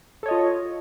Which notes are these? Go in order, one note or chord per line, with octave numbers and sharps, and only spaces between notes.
F4 A4 C#5 D#5